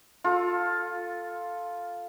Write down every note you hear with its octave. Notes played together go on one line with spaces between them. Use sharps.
F4 A4